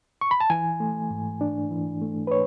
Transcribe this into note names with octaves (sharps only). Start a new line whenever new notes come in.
C#6
B5
A5
E3 G#5
A3
G#2
D4
E3
A3
B4
C#5